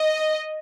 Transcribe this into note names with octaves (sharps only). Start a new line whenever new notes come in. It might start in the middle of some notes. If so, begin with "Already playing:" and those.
Already playing: D#5